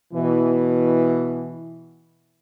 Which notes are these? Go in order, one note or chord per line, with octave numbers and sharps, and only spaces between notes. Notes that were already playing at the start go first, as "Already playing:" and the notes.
B2 E3